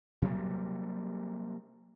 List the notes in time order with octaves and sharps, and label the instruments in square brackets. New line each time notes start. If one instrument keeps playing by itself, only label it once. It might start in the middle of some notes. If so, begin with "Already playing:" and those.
[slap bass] C3 F#3 G3 A#3